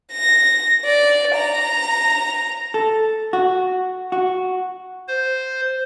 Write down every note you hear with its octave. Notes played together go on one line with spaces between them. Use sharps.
A#6
D5
A#5
A4
F#4
F#4
C5